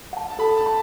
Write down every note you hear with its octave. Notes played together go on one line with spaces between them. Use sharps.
F#5 A5
A5
A4 B5
A5
B5